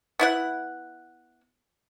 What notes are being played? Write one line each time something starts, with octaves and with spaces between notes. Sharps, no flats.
B3 E4 F#5